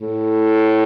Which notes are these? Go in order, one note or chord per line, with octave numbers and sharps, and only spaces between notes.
A2